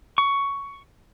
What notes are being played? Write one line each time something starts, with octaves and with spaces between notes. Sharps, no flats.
C#6